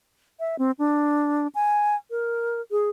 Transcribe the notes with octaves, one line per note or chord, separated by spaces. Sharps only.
E5
C4
D4
G#5
A#4
G#4